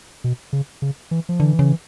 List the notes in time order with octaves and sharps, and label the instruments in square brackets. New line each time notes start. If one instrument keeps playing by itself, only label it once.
[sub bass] B2
C#3
C#3
E3
F3
[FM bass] D3 [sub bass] E3
[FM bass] C#3